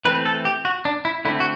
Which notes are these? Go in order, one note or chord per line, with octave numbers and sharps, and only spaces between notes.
E3 A3 C4 B4
A4
G4
F#4
D4
E4
D3 A3 C4 E4
F#4